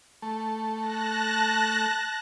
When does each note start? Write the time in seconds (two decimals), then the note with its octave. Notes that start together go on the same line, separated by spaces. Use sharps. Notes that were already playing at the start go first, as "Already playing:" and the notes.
0.22 A3
0.79 A5 F#6 A#6